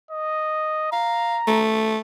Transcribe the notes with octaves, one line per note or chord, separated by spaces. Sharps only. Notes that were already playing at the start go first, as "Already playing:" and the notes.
D#5
F5 A#5
A3